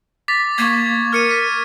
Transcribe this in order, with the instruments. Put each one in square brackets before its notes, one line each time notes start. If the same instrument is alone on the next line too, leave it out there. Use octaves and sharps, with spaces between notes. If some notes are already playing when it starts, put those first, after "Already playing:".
[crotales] D6 A6 B6
[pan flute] A#3 [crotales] C#6 G#6
[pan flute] A#4 [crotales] F6 C#7 D#7
[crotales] B6 D#7